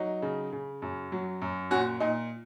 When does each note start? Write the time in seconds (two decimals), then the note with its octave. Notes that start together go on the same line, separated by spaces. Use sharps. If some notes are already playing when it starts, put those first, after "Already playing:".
Already playing: F#3 D#4
0.22 C#3
0.52 C#3
0.82 F#2
1.12 F#3
1.42 F#2
1.71 A#2 C#4 F#4
2.00 A#2 D#4